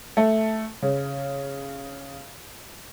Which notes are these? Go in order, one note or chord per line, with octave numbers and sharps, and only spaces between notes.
A3
C#3